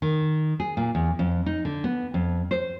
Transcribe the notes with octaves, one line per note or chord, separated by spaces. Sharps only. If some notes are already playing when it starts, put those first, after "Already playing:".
D#3
G#4
A#2
E2
F2
D#4
D3
B3
F2
C5